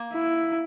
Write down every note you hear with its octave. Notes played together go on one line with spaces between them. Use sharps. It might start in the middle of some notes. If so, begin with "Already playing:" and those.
Already playing: A#3
E4